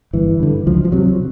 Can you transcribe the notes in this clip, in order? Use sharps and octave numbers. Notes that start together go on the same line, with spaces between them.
G1 E3
G2 D3
C#2 F3
F3
C3 F#3